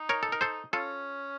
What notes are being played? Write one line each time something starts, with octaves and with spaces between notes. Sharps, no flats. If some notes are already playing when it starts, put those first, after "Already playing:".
Already playing: D#4
A#4 C#5
A4
A#4
A4 C5
C#4 F4 A4